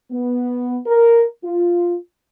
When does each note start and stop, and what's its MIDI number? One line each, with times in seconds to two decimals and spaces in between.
0.12 0.77 59
0.87 1.24 70
1.44 1.96 65